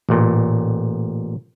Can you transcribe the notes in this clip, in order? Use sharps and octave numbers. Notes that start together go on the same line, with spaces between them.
A1 A#2